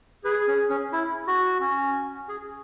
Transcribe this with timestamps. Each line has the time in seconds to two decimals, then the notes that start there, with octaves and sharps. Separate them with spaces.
0.24 G#4 B4
0.47 C#4
0.70 C#4
0.93 E4
1.27 F#4
1.61 C#4
2.29 G#4